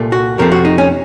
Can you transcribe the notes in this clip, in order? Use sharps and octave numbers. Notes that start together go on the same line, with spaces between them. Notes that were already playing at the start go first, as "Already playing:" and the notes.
Already playing: C2 A#2 A3
F#4
F2 C3 F3 A3 A#4
F#4
D#4
C#4